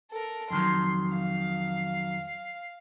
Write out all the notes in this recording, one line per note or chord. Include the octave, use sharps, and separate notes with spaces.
A4 A#4
F2 D#3 F#3 C6
F5